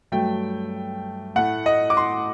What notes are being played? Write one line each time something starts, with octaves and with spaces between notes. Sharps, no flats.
G2 F#3 A3 G5
A2 A3 F#5
D#5
D6
C6